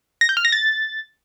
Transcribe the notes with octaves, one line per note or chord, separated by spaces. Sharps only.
A#6
G6
F6
A#6
A6